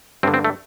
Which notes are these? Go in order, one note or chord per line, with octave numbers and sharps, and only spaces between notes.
G2 D3 C4
C4
A3